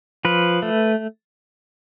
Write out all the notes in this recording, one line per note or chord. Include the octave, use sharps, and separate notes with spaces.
F3 B4
A3